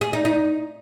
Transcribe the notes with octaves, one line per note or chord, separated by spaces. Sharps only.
G#4
D#4
D#4